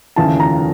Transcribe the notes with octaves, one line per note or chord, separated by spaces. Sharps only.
F1 D#2 C#3 E3 A5
A#5